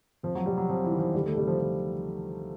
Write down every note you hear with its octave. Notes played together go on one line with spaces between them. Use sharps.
F2 F3
F#3
C3 G3
F#3
F2 F3
E3
D#3
F3
D2 G3
A3
C3 G3
F3
F3